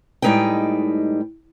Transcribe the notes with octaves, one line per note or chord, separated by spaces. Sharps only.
A2 G3 G#3 D#4 B4 G5